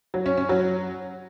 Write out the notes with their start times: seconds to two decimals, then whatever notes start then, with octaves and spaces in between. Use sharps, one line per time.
0.14 F#3
0.26 C#4
0.37 C#4
0.49 F#3